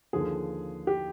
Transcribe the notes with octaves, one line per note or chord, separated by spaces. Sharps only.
D#2 D3 F3 G#4
G4